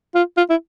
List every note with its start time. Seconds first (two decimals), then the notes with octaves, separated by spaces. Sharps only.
0.15 F4
0.37 F4
0.50 E4